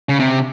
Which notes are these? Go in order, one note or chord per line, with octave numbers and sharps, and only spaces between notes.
C#3
C3